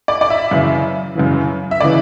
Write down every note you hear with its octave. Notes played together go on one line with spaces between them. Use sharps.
D5
D5
E5
F#2 C#3 E3
F#2 C#3 E3
E5
C#3 E3 D5